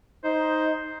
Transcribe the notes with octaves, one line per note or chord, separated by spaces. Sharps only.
D#4 C5